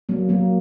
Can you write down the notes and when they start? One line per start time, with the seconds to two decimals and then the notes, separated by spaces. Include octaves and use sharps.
0.09 F#3 A#3
0.29 F#3 A#3